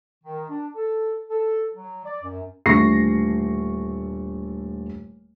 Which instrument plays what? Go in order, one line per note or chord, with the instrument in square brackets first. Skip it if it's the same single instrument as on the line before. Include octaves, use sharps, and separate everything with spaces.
[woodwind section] D#3
D4
A4
A4
F#3
D5
F#2
[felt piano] D#1 D3 A3 C#6 A#6 C7